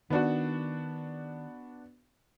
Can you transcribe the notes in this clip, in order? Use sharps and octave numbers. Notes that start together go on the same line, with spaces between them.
D#3 B3 D4 F#4